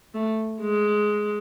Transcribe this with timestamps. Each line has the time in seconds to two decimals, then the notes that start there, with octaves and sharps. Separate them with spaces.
0.15 A3
0.61 G#3